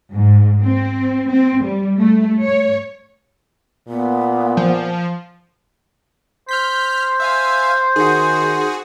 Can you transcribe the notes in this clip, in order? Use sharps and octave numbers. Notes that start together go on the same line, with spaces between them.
G#2
C4
C4
G3
A3
C#5
A#2 B3
F3
C5 F6 G6 B6
E5 F5 G#5
D#3 F#4 G#4